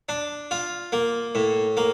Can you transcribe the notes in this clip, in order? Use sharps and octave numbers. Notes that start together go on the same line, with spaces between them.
D4
F4
A#3
A2
A#3